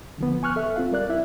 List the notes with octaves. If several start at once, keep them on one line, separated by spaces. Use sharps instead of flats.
D3 F3 B3
G#5 C#6 F6 F#6
A4 E5
C4 F4 F5
G3 A#4 D5 F#6
E4 E5